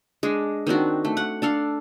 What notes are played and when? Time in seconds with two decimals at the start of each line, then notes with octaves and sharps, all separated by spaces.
0.23 G#3 D4
0.67 D#3 C4 D4 F#4
1.05 A3
1.17 F#5
1.42 D4 A4 F5